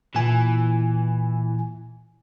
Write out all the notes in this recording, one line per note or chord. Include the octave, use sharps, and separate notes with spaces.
A#2 E3 G#5